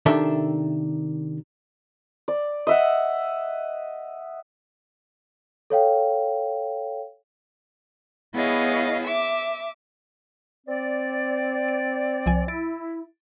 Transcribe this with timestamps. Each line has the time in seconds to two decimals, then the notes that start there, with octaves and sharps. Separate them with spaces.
0.06 C3 D#3 D4 A4 E5
2.28 D5
2.67 D#5 E5 F#5
5.70 A4 C#5 F5 G5
8.34 B3 E4 G#4 C#5 D#5 F5
9.05 E5 D6
10.67 C4 D5
11.68 D7
12.26 C2 F3 G#5
12.48 E4 A6 D7